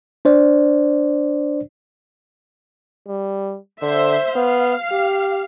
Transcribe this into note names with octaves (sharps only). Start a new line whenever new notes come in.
D4 C5 D5
G3
D3 C5 E5
B3 F5
G4